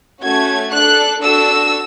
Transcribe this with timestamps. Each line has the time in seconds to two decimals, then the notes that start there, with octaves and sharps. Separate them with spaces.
0.22 A3 C#4 F#4 A4 G#6
0.71 D4 A4 F#6
1.21 D4 F#4 A4 E6